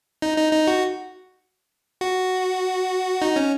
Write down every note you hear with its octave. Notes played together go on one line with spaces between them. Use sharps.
D#4
D#4
D#4
F#4
F#4
D#4
C#4